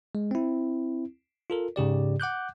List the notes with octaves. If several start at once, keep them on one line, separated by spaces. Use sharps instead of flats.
G#3
C4 E4
F4 A4 A#4
G#2 C#3 G4 D5
F#5 D6 F#6 G6